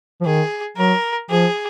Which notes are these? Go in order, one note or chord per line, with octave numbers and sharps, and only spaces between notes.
F3
D#3 G#4
F#3 A#4
F3 G#4